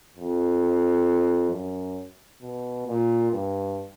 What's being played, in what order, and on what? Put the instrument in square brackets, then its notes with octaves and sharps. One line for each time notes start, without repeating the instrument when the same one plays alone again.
[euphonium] F2
F#2
B2
A#2
G2